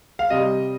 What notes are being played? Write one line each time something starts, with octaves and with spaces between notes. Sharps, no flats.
F5
C3 D#5
G3